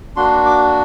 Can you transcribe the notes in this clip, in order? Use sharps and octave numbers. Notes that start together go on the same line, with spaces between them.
A#3 D4 F#4 C6
D6